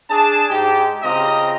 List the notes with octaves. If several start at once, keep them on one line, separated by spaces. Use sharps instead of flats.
D4 G#4 A5
G#2 G#3 D#4 G4
C#3 C4 F4 G4 D#5 A#5